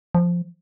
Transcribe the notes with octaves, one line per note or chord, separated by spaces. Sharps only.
F3